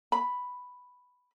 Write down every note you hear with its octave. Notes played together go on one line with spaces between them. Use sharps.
B5